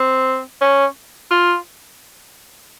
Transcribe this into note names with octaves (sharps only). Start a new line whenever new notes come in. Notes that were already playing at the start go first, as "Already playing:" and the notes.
Already playing: C4
C#4
F4